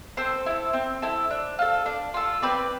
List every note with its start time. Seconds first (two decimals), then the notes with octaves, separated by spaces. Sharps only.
0.17 C4 A4 C5
0.46 E4 A4
0.73 C4
1.02 E4 A4
1.30 D4
1.59 F4 A4
1.86 D4
2.14 F4 A4
2.42 C4 B4 D5